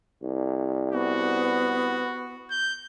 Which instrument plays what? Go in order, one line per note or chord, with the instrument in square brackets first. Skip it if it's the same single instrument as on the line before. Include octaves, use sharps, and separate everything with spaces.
[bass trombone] C2
[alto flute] B3 [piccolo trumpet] F#4
[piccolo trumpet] G6